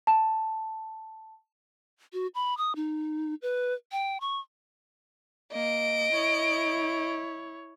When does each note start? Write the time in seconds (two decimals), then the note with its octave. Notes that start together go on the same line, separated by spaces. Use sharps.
0.07 A5
2.13 F#4
2.35 B5
2.58 D#6
2.76 D#4
3.42 B4
3.92 G5
4.21 C#6
5.53 A#3 D#5 D7
6.13 E4 C#5